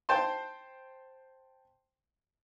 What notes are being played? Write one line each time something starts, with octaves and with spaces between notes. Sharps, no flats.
C5 G5 A5 C6